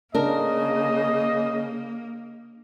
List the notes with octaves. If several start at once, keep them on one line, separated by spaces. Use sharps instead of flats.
C#3 A#3 D4 A#4 D#5